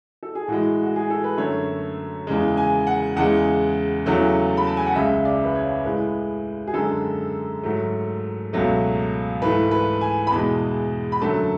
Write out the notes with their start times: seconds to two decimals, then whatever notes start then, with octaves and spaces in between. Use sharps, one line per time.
0.23 A4
0.35 G#4
0.48 A2 E3 G#3 F#4
0.83 F#4
0.96 G#4
1.10 A4
1.24 B4
1.37 F#2 D3 A3 C#5
2.27 E2 C#3 G#3
2.57 G#5
2.87 F#5
3.16 E2 C#3 G#3 F#5
4.06 E2 C#3 F#3 A3
4.57 B5
4.67 A5
4.77 G#5
4.87 F#5
4.95 C#2 C#3 G#3 E5
5.25 D5
5.45 B4
5.55 C#5
5.84 A2 G#3 B4
6.67 G#4
6.74 F#2 D3 G#3 A4
7.63 G#2 F#3 A3
8.53 C#2 B2 F#3 A3
9.42 G#2 E3 A3 B4
9.71 B4
10.01 G#5
10.27 B5
10.31 E2 B2 G#3 A5
11.12 B5
11.21 F#2 D3 F#3 A3 A5